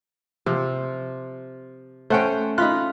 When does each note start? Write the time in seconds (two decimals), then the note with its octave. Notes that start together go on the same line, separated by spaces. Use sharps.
0.46 C3 F3
2.10 A3 C#4 C5 F#5 G5
2.58 D#4 F4 B5 F#6